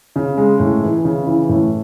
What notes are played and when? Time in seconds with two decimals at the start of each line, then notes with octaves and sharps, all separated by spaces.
0.16 C#3
0.38 G#3
0.60 A2
0.83 E3
1.05 C#3
1.27 E3
1.49 A2